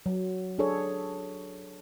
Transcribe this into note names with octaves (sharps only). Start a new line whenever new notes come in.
F#3
D4 G#4 A4 C#5